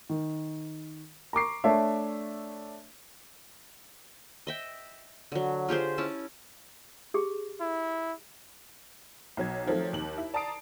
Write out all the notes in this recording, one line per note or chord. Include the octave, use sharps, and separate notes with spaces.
D#3
A#5 C#6 D6 C7
A3 D4 C#5 E5
D#5 E5 G5
D3 F#3
F4 G4 G#4 C5
C#4 E4 A5
G4 G#4
E4
B1 F#3 G#6
D#3 F3 F#3 A3 C4
D#2 F#7
E4
D5 A5 A#5 D#6 C7 D7